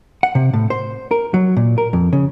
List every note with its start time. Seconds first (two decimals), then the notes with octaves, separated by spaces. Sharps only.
0.23 F#5
0.35 C3
0.53 A2
0.70 C5
1.11 A#4
1.34 F#3
1.57 A#2
1.78 A#4
1.93 F2
2.13 C#3